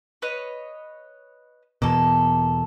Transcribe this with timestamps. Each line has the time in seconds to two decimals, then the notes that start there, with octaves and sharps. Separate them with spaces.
0.22 B4 C#5 D#5
1.82 E2 B2 A#3 A4